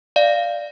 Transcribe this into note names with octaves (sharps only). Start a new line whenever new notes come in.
D5 F5